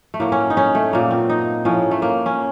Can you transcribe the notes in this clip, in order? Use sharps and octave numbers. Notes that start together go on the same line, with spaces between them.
A3
A2 F#3 A#3
C#4
D#4
C#4
A3
A#2 F#3 A#3
C4
D#4
A2 F3 C#4
A3
A#3
C#4